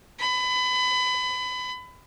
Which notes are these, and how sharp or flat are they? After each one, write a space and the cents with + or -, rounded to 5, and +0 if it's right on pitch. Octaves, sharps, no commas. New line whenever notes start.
B5 +25